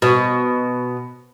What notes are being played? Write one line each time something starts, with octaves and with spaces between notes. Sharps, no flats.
B2